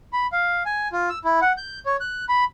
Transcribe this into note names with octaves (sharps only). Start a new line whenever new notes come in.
B5
F5
G#5
F4
E6
E4
F#5
G6
C#5
F#6
B5